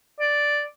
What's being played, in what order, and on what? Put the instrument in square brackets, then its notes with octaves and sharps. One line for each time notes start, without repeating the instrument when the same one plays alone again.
[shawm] D5